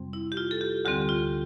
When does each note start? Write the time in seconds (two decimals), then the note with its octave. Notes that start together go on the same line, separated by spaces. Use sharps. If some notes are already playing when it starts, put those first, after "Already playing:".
Already playing: F2 C3 G3 C4
0.13 E4
0.32 G4
0.37 F4
0.51 A4
0.61 G4
0.85 D2 D3 G3 C4 G4
1.09 F4